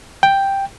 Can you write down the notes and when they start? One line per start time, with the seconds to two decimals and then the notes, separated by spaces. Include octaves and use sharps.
0.23 G5